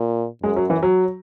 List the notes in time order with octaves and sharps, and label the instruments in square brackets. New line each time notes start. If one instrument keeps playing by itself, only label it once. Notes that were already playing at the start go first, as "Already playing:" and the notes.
Already playing: [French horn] A#2
[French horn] F#2 [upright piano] G#3
[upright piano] F#3
E3
F#3